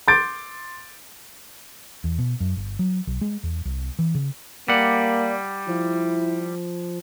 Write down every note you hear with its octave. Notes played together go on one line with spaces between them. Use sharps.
C6 D6 G6 A6 D7
E2
B2
F#2
G1
F#3
B1
G#3
E2
C2
E3
C#3
G3 A#3 D5 F#5
F3 E4